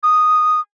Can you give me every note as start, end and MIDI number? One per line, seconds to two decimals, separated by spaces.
0.03 0.60 87